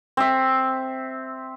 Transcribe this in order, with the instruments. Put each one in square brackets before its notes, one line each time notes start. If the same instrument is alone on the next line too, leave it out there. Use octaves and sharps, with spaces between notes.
[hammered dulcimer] C4 E5